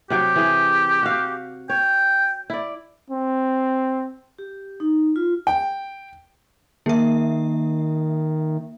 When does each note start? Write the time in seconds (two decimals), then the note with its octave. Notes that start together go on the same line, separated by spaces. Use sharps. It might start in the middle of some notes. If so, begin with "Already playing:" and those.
0.10 C3 F#3 G4 G5
0.36 E3 G#4
1.03 F#4 F5
1.70 C#5 G5
2.50 E4 D5
3.10 C4
4.39 G4
4.80 D#4
5.16 F4
5.47 G5
6.86 D#3 A#3 E5